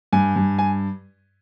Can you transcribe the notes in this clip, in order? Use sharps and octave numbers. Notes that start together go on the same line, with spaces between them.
G2 G#5
G2
G#5